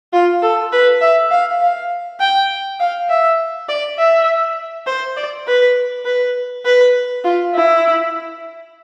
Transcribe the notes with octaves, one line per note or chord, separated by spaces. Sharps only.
F4
A4
B4
E5
F5
F5
G5
F5
E5
D5
E5
C5
D5
B4
B4
B4
F4
E4